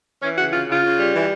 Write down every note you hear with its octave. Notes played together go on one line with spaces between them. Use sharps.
E3 C#4
C#3 F#4
C#3 F4
C#3 F4
C#3
G3
E3